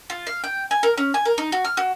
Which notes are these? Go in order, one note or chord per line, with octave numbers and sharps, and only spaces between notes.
F4
F5
G5
G#5
A#4
C#4
G#5
A#4
D#4
F#4
F6
F#4